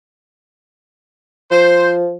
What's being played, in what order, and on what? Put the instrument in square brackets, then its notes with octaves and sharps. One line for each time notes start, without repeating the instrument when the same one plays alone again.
[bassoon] F3 [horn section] C5